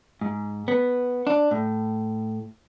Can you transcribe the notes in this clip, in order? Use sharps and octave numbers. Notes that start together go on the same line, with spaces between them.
G#2
B3
D4
A2